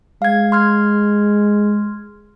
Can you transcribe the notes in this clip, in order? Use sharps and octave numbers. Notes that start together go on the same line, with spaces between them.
G#3 F5 G#6
C6 F6 G#6